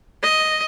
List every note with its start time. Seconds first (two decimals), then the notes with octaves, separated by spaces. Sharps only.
0.23 D#5